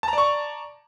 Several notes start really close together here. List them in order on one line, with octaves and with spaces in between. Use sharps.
A5 A#5 D5 C#6